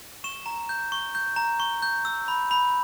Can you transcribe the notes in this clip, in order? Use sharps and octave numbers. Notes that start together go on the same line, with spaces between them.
C#6 E7
A#5
G6
C#6
G6
A#5
C#6
G6
E6
B5
B5